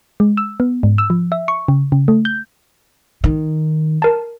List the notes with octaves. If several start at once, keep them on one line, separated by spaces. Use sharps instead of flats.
G#3
E6
B3
G#2
E6
F3
E5
C#6
C#3
C#3
A3
G6
D#3
A#4 A5